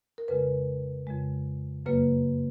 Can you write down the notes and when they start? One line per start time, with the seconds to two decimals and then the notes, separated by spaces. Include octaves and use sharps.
0.18 A#4
0.28 F2 C#3 G#3 B4
1.07 F2 C#3 G#3
1.86 F#2 C#3 F#3 A#3 B4